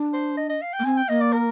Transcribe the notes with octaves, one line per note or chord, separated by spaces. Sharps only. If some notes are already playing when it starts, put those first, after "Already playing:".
Already playing: D4
C5
D#5
D#5
F5
G5
A#3
C4 G#5
G5
A#3 D#5
D5
A#4